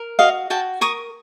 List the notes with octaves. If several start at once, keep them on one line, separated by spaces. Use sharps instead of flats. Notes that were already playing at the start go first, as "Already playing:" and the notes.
Already playing: A#4
F#4 D#5 F5
F#4 G5 A5
A#4 C#6 D#6